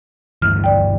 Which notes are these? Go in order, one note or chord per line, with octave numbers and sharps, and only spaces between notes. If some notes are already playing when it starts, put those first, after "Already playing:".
D2 G2 E3 F6
D5 G5